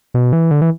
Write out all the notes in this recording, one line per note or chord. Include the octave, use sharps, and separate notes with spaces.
B2
E3
D3
E3